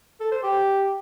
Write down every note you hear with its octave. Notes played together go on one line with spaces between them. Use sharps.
A4
C5
G4